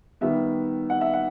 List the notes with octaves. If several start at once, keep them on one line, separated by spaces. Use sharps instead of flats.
D#3 G3 B3 E5
F#5
E5
F#5